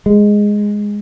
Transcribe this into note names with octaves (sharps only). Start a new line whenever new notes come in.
G#3